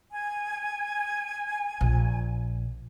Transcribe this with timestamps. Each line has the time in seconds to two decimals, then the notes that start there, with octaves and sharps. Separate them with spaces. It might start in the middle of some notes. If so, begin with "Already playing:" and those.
0.12 G#5
1.81 A#1